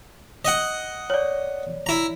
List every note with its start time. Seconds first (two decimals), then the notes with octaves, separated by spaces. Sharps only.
0.45 D#5 F#5
1.10 C#5 D5
1.86 E4 A#5